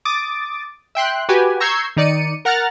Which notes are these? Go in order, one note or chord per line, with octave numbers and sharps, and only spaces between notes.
D6 D#6 A6
E5 G5 C6 F#6
F#4 G4 B4 G#5
A#5 C#6 E6 G6 G#6 C7
D#3 D#4 D5 C#7 D#7
A#4 F#5 A#5 F6 F#6 A6